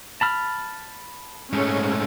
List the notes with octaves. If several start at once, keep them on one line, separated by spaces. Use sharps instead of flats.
A5 B5 F6
G#2 G#3 A3 C#4